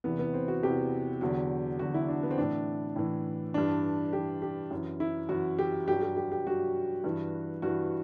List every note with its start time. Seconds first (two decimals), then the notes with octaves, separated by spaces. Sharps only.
0.04 E2 C3 E3 B3
0.19 B3
0.34 C4
0.48 F#4
0.63 E2 C3 E3 G4
1.21 E2 D3 F#3
1.79 E2 D3 F#3 F#4
1.94 E4
2.09 D4
2.23 B3
2.31 C4
2.38 A2 E3 D4
2.96 A2 E3
3.54 G2 E3 D4
4.13 G2 E3 G4
4.42 G4
4.71 F#2 E3
5.00 E4
5.29 F#2 E3 F#4
5.59 G4
5.88 G2 F#3 G4
6.02 G4
6.17 G4
6.32 G4
6.47 G2 F#3 F#4
7.04 G2 E3
7.62 G2 E3 F#4